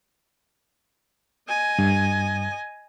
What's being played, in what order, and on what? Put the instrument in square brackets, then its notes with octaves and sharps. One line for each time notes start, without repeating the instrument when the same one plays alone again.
[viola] D#5 G#5
[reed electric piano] G2